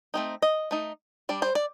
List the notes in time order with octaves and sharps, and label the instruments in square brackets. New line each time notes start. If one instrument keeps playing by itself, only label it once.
[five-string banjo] A3 C4 D#4
D#5
A3 D#4
G3 D4 D5
C5
D5